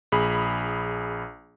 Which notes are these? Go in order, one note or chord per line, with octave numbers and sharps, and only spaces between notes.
A#1 G#4 B5